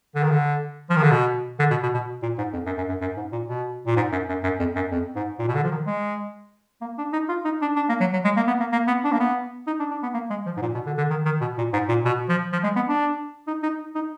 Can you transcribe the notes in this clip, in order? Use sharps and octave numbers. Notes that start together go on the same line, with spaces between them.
D3
D#3
D3
F3
D#3
D3
B2
D3
B2
B2
B2
A#2
G#2
F2
F#2
F#2
F#2
F#2
G#2
A#2
B2
A#2
G#2
F#2
F#2
F#2
F2
F#2
F2
G#2
A#2
B2
D3
F3
D#3
G#3
A#3
D4
D#4
F4
D#4
D4
D4
A#3
F#3
F#3
G#3
A#3
B3
A#3
A#3
B3
D4
A#3
B3
D#4
D4
D4
B3
A#3
G#3
F3
G#2
A#2
B2
D3
D3
D#3
D#3
B2
A#2
G#2
A#2
B2
F3
F3
G#3
B3
D4
D#4
D#4
D#4